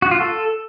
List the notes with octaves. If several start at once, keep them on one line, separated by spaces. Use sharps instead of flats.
F#4
F4
A4